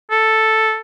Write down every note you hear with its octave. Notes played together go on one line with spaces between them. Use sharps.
A4